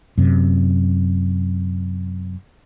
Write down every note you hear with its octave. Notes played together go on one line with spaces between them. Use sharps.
F#2 C3